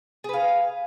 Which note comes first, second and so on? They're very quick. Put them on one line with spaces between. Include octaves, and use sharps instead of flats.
G#4 B4 F5